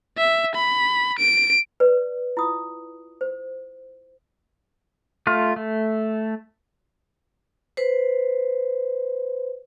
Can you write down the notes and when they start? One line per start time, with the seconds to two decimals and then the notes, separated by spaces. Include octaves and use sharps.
0.18 E5
0.55 B5
1.19 D7
1.80 B4 D5
2.37 E4 F4 D#6
3.21 C5
5.27 A3 F4
5.56 A3
7.77 B4 C5